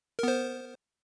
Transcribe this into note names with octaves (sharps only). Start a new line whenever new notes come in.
B3 A#4 C5